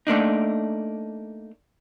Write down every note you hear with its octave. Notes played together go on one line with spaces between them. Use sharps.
A3 A#3 D4 D#4